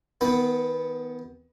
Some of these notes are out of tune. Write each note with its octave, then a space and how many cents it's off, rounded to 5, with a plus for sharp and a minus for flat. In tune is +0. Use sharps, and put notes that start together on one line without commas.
D#3 +30 B3 +0 B5 +0